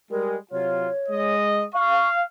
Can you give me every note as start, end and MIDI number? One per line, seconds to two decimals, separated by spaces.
0.11 0.37 55
0.11 0.37 56
0.11 0.36 70
0.52 0.88 48
0.52 0.88 54
0.52 0.88 65
0.52 1.35 73
1.09 1.65 56
1.09 1.65 75
1.74 2.23 77
1.74 2.09 85